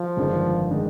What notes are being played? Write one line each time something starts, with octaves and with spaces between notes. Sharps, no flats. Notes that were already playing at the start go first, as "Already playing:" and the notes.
Already playing: F3
G1 F2 D#3 G#3 D4
D#3 G#3 D4